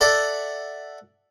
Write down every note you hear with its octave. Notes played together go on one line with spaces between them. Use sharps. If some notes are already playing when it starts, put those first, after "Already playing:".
A4 D5 E5 F#5